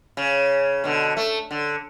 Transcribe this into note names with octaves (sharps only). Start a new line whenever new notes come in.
C#3
B2 D3
A3
D3